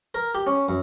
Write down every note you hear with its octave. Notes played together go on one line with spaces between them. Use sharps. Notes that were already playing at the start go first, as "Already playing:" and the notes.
A#4
G4
C#4
F#2